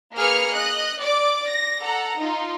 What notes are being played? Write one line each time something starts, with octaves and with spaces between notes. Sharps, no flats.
A#3 G#4 B4 F6 C#7
D#5 F#6
D5 D6
A#6
A4 F#5 A#5
D#4 F4